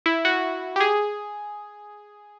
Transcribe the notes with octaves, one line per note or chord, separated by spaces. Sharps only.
E4
F#4
G4
G#4